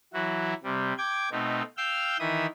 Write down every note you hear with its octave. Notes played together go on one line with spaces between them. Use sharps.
E3 F#3 E4 F#4
C3 G3
G5 D6 G#6
B2 A3 C4 D#4
F5 G5 E6 F6 G6
D#3 E3 E5 D#6